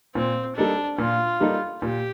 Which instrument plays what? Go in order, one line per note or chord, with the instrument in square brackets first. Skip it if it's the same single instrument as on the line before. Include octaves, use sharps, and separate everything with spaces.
[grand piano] A#2 [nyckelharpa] C4
[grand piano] G3 A#3 D#4 A4 [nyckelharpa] D4
[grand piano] A#2 [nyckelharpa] F4
[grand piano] G3 A#3 D#4 A4
[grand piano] A#2 [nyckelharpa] G4